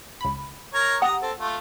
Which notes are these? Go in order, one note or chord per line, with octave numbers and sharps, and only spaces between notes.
C#2 B5
A#4 C#5 A#5
G4 F#5 A#5 D#6
C4 A4
A3 F4